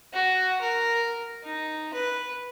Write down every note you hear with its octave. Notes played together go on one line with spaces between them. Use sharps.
F#4
A#4
D#4
B4